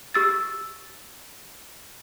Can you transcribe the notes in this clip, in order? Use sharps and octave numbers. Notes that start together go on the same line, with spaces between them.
G4 E6 A6